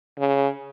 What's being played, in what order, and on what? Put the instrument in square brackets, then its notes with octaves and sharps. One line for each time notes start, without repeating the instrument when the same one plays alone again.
[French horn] C#3